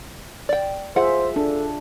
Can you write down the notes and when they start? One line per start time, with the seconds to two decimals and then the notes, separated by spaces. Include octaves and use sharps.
0.49 D5 G5
0.96 F4 G#4 C5 E5 F#5
1.36 D4 A4